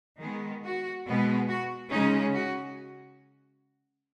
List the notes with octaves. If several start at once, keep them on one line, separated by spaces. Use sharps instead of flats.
D#3 G#3 B3 G#4
F#4
B2 G#3 B3
F#4
C#3 G#3 C#4 D#4
F#4